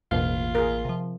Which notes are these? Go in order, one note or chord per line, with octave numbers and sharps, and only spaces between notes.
A1 E2 B2 A#3 F4 F6
G#4 A#4
C3 F3